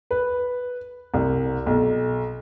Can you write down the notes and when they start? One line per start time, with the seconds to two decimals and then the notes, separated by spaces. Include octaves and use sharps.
0.11 B4
1.14 C2
1.66 B1